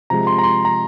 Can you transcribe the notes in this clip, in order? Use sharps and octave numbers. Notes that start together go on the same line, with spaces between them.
C3 F3 G#3 A#5
C6
A#5
C6
A#5